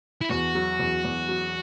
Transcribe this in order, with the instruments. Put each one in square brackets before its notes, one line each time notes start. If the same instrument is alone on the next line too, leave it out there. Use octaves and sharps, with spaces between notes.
[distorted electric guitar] E4
[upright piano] E2 [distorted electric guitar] F#4
[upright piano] F#3
E2
E2
F#3